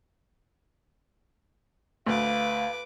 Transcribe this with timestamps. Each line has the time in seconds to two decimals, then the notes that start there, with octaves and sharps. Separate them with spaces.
2.07 D2 B4 F5 D6